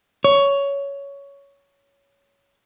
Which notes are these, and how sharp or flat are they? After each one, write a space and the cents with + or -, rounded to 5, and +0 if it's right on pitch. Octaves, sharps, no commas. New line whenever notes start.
C#5 +10